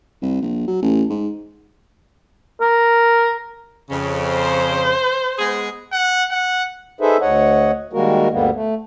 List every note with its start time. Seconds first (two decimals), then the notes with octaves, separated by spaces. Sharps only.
0.22 C2
0.42 A#1
0.68 F#3
0.82 A1
1.10 G#2
2.61 A#4
3.90 F2 C#3
4.29 C5
5.39 G#3 B3 G#4
5.92 F#5
6.31 F#5
7.01 D#4 G#4 A4 B4 C5 E5
7.21 D2 C#5 D#5 F#5
7.93 D#3 G3 G#3 A#3 F#4 A#4
8.32 D2 G2 D3 G3 A#3 B3
8.55 A3